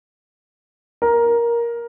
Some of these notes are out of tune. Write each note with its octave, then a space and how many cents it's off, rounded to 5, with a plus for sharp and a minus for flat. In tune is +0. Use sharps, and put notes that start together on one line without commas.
A#4 +10